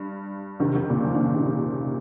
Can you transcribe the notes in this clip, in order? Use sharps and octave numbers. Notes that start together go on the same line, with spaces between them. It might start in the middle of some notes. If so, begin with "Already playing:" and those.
Already playing: G2
C3 D#3
C3 D#3
A#2 C#3
F3
D#3
C#3
C3 D#3